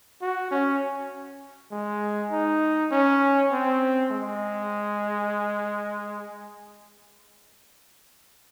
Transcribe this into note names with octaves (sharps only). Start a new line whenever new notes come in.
F#4
C#4
G#3
D#4
C#4
C4
G#3